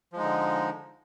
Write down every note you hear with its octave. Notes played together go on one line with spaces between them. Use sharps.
D3 F3 G#3 D#4